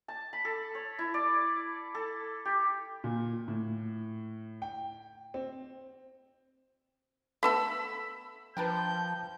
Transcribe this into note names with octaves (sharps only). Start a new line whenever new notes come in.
A5
B5
A4
C#5
E4
D5
A4
G4
A#2
A2
G5
C4
A3 B3 A4 B5 E6
F3 D4 A#4 B4 G5 A5 G6